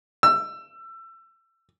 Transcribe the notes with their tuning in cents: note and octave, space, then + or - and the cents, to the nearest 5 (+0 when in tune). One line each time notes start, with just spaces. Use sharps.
E6 +25